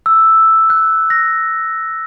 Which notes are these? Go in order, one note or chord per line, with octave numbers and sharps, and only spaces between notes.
E6
F#6
A#6